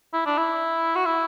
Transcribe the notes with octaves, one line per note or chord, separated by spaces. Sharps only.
E4
D4
E4
F#4
E4